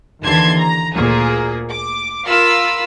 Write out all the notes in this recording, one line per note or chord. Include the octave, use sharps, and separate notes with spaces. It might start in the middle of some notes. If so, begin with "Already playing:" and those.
D#2 D3 E3 A5 C6 G#6
A#5
D2 A#2 A#3 G#4
D6
F4 A#4 F5 B5 E6